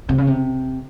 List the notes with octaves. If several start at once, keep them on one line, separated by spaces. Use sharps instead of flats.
C3
C#3
C3